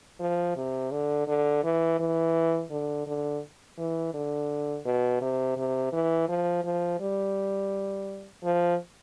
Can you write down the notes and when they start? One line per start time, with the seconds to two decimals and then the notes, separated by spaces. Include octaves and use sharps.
0.20 F3
0.56 C3
0.92 D3
1.27 D3
1.64 E3
1.99 E3
2.71 D3
3.07 D3
3.78 E3
4.14 D3
4.85 B2
5.21 C3
5.57 C3
5.93 E3
6.29 F3
6.64 F3
7.00 G3
8.43 F3